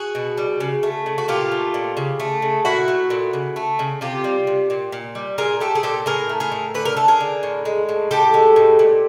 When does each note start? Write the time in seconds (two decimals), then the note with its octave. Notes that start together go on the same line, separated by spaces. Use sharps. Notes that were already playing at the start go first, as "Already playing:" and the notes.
Already playing: F#4 G#4
0.15 B2
0.37 G3
0.60 C#3
0.83 A3
1.06 C#3
1.18 F#4
1.28 A#2 F4 G4
1.52 A3
1.74 A#2
1.97 C#3
2.20 A3
2.42 C#3
2.65 A#2 E4 F#4
2.88 A3
3.10 A#2
3.33 C#3
3.56 A3
3.79 C#3
4.01 C3 F4 G4
4.24 G3
4.47 C3
4.70 A#2
4.92 A#2
5.15 G3
5.38 A#2 G#4 A#4
5.60 A3 G4 A4
5.75 G#4
5.83 A#2 G4 A4
6.06 A2 G#4 A#4
6.29 A3
6.40 G#4 A#4
6.52 A2
6.75 D3 B4
6.85 A#4
6.97 A3 A4
7.08 G#4 A#4
7.20 D3
7.43 A2
7.65 G#3
7.89 A2
8.11 A2 G4 A4
8.34 G#3
8.56 A2
8.79 A#2